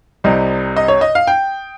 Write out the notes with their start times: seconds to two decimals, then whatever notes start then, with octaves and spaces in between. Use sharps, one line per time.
0.24 C2 C3 G3 D#5
0.77 D#5
0.88 C#5
1.01 D#5
1.15 F5
1.27 G5